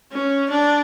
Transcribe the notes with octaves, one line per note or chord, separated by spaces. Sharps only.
C#4
D4